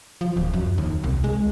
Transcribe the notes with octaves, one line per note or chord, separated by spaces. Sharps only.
F3
D1
F#2
D#2
C2
G#3